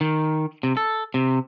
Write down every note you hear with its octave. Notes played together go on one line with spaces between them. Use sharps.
D#3
C3
A4
C3